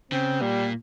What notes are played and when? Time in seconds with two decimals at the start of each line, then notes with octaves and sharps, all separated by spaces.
0.11 C#3 C4
0.41 A#2 G3